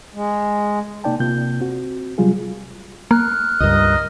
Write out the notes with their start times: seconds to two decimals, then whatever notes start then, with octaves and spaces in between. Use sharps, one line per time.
0.14 G#3
1.04 C3 A#3 D#4 D5 G5 A5
1.20 C3 A#3 F4 G6
1.60 C4 F#4
2.18 C3 F#3 G3 F4 G#4
3.11 A#3 F6 F#6
3.60 C#2 G2 A#4 D#5